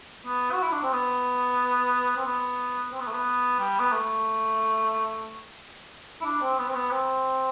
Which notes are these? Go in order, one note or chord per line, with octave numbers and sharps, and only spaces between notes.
B3
F#4
E4
D4
C4
B3
C4
B3
C4
B3
A3
B3
G3
B3
A3
E4
D4
C4
B3
C4
B3
C4